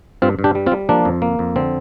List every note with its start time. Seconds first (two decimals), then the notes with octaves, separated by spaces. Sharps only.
0.22 G2 C4 F4
0.39 G2
0.44 D4 G4
0.55 G3
0.66 C4 F4
0.72 G3
0.89 F3 A#3 D4
1.05 F2
1.22 A#3
1.39 F2
1.56 D3 C4